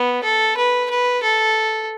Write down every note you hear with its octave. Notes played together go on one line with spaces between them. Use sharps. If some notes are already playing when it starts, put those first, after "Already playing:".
Already playing: B3
A4
B4
B4
A4